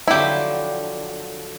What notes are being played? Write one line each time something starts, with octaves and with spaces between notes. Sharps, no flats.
D3 F3 F#3 E4 G4